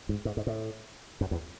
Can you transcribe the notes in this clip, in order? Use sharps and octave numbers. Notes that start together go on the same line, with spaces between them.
G#2
G#2
G#2
A2
F#2
E2